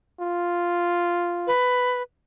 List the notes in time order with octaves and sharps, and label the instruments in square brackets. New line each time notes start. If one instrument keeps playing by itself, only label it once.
[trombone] F4
[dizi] B4